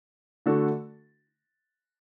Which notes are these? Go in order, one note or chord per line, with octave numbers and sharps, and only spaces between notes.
D3 A3 D4 F#4 A4